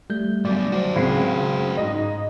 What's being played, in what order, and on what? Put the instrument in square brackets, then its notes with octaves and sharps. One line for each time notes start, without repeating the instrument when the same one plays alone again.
[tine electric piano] G3 A3 G6
[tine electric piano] F#3 [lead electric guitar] G3 B3 [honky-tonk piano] D5
[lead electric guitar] F#4 C5
[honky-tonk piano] C#2 C4 C7
G#2 D#5